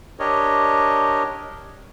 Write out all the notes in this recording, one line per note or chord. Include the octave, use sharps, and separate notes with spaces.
D4 G4 A#4 C#5 D#5